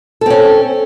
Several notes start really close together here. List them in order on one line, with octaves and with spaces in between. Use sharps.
A4 C4 C#4